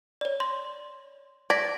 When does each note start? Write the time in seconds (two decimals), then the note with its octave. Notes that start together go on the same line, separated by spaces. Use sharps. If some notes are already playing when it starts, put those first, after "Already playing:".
0.21 C#5 D5
0.40 C6
1.50 D5 G#6 A#6 B6